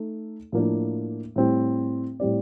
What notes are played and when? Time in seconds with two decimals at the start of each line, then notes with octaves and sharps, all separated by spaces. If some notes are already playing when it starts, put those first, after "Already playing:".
Already playing: A3 D#4 A4
0.52 A2 F3 A#3 D4
1.36 A2 G3 C4
2.20 A2 G3 C4 G4 D5